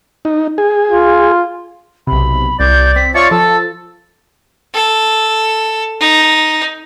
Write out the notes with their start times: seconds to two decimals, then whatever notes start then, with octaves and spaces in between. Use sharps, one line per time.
0.25 D#4
0.58 G#4
0.91 F4
2.07 B1 C3 B5
2.59 C2 D5 G6
2.96 C4 B6
3.15 F4 C#5 D5 E5 A5 C#6 C#7
3.31 F3 A4 E6
4.74 A4
6.00 D#4